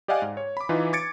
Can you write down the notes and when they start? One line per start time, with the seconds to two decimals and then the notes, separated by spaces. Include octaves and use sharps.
0.08 G4 D5 D#5 F5 F#5 G#5
0.22 G#2
0.37 C#5
0.57 B5 D6
0.69 E3 D#4 F4 B4
0.93 D6 G#6 A6 C#7 D7